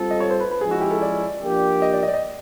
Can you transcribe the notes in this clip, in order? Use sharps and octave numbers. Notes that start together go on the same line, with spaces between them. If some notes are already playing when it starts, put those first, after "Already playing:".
Already playing: G3 C4 F4 A4
D#5
C#5
C5
B4
B4
F3 G#3 C#4 E4 G#4
F#4
G4
A4
D5
F3 A#3 D4 G4
D#5
D5
D#5
D5
D#5